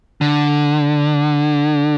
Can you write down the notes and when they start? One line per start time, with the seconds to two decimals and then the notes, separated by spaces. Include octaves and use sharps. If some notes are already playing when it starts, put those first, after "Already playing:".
0.21 D3